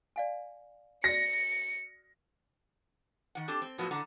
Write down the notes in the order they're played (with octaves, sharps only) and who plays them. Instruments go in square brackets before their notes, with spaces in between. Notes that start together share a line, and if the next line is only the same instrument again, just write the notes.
[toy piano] D5 F5 G#5
[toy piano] F#4 D5 [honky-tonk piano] A#6 [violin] C#7
[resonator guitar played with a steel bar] D#3 F#5
C4 D4 G4 A4
C4
A2 F3 F#3 A#3 B3 F#4
A2 D3 F#5 A#5